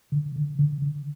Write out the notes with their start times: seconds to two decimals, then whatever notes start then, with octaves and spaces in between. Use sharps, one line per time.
0.12 D3
0.36 D3
0.59 D3
0.82 D3